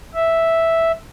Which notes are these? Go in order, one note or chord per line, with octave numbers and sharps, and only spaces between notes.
E5